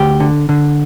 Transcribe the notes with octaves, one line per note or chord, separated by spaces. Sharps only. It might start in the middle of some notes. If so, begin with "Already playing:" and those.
Already playing: D2 G4
D3
D3